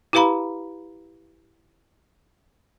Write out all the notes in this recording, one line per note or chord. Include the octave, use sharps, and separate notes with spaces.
E4 G4 B4 F5 A#5 B5